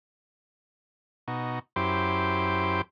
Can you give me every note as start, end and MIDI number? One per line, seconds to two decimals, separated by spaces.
1.28 1.59 47
1.28 1.59 63
1.28 1.59 66
1.76 2.81 42
1.76 2.81 64
1.76 2.81 67
1.76 2.81 72
1.76 2.81 84
1.76 2.81 86